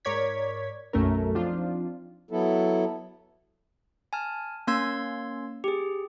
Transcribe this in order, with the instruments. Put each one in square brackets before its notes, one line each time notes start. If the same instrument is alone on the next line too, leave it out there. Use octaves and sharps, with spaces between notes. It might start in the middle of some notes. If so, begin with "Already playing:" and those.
[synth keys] G#2 A#4 C#5 D5 G#6 B6
B1 F#2 A3 C#4 A#4
F3 C4 D4 D#4 F4
[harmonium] F#3 B3 E4 A4
[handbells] G#5 A5 F6
A#3 C#4 C6 E6 G#6
G4 G#4